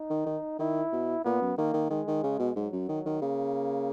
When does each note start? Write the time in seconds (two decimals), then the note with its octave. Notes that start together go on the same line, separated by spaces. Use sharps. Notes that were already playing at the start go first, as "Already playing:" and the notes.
Already playing: D#4
0.10 D#3
0.26 D#3
0.59 D#3 E4
0.93 B2
1.25 A#2 B3
1.41 F#2
1.58 D#3 A#3
1.74 D#3
1.90 D#3 G#3
2.07 D#3
2.23 C#3
2.39 B2
2.56 G#2 F#3
2.73 F#2
2.88 D#3
3.06 D#3
3.21 C#3 A#3